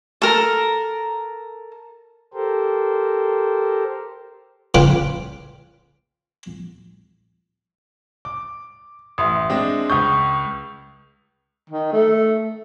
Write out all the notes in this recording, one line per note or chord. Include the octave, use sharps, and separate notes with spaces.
A4 A#4
G4 A4 A#4 C5
C#3 F4 B4 F5 G5 D6
D6
A1 E5 C6 D#6
G#3 C4 D4
C#2 C#6 D#6 G6
D#3
A3